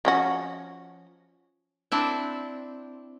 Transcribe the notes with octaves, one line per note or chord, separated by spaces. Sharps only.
F3 C#4 F#4
C4 D4 E4